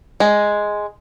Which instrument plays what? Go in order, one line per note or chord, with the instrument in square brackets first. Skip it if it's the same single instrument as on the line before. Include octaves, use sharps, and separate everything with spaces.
[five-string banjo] G#3